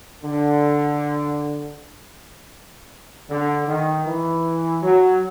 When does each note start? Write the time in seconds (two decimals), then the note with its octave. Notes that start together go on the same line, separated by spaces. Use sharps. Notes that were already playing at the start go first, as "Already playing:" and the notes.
0.23 D3
3.29 D3
3.67 D#3
4.06 E3
4.82 F#3